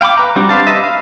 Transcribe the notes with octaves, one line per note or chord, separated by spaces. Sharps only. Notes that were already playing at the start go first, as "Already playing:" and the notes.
F5 G5 B5 D6
B4 A#5
G3 C4 D4 F#4 G4
B4 C5 F5 A5
B4 D#5 E5
F5